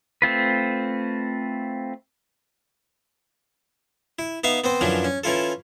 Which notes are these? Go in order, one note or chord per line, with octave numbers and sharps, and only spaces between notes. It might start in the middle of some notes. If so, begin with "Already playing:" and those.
A3 C4 F4 B4
E4
B3 D#4 E5 F5
B3 C4 C5
F#2 E3 F3 C#4 D4
C#4
E3 C#4 E4 F4 A4